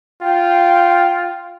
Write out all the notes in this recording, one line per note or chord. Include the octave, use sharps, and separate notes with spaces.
F4 G5